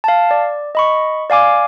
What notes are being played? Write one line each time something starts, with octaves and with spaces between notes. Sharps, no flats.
F5 A5
D5
D#5 B5 C#6
D5 F5 G#5 D6